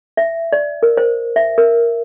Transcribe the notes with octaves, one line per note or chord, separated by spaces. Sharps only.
E5
D5
A#4
C5
E5
A#4